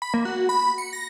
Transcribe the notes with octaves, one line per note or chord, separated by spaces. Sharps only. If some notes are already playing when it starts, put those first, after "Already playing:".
B5
A#3
F#4
B5
C#7
A#6